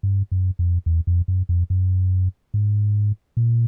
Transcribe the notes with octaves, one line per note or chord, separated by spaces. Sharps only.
G2
F#2
F2
E2
F2
F#2
F2
F#2
G#2
A#2